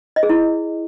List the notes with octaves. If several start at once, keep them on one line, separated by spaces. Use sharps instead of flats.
D#5
G#4
E4